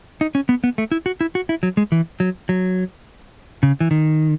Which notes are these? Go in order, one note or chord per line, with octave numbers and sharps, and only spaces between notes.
D#4
C#4
B3
B3
A3
E4
F#4
E4
F#4
E4
F#3
G#3
E3
F#3
F#3
C#3
E3
D#3